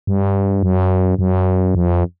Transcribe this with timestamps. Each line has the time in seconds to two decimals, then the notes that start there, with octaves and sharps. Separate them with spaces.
0.07 G2
0.63 F#2
1.19 F#2
1.75 F2